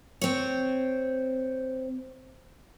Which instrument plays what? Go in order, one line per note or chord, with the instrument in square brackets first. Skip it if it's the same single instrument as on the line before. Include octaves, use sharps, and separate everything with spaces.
[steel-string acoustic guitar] C4 C#5